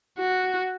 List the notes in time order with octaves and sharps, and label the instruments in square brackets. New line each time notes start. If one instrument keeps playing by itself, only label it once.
[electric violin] F#4